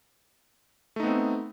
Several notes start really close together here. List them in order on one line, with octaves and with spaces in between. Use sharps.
A3 D#4 B3 C4